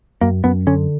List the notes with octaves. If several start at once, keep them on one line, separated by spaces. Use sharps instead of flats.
F#2 A#3
F#2 B3
D3 C#4